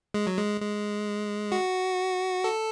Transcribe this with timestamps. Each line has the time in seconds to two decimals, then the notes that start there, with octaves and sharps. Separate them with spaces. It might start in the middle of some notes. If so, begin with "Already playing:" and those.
0.14 G#3
0.27 F#3
0.38 G#3
0.60 G#3
1.52 F#4
2.44 A4